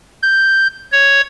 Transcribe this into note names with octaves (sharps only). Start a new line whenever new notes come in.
G6
C#5